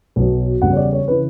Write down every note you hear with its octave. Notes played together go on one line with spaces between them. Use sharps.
B1 B2 F#3
E2 C#3 G3 F#5
C#5
D5
C#5
C#3 E3 B4